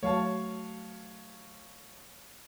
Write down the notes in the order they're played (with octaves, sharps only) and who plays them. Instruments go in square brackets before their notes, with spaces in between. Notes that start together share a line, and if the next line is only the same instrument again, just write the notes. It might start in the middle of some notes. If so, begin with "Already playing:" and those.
[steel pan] F#3 A3 [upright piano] C#5 F5 A5